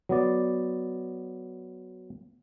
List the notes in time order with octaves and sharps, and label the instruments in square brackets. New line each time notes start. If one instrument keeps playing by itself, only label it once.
[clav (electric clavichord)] F#3 B3 D5